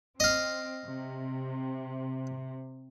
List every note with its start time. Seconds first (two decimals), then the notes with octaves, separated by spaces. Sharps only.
0.20 C4 D#5 F5
0.86 C3